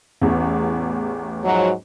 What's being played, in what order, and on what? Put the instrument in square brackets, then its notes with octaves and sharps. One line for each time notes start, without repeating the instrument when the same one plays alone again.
[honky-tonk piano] A1 E2
[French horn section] G#2 F3 F#3